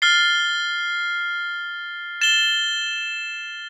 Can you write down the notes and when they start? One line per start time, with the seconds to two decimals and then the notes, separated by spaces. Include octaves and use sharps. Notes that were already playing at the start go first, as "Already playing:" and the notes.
0.02 F6 A6 C7 G7
2.21 A6 E7 G7